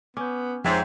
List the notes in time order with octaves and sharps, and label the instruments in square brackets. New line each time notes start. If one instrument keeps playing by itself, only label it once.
[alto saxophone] B3 [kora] C#4 [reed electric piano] D6 G6
[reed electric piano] F2 C5 C#5 [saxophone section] G#2 [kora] C4 E5